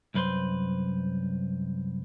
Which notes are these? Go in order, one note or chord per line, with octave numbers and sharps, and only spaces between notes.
C2 F#2 B4 C5 C6